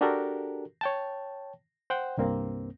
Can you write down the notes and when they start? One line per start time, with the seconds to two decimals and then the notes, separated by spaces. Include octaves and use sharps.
0.01 D4 F#4 G4 A4 A#4
0.81 C#5 G5 A5
1.90 C5 F#5 G5
2.17 C2 G2 A#3 C4